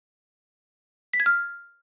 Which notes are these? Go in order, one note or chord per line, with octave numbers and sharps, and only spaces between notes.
B6
G#6
F6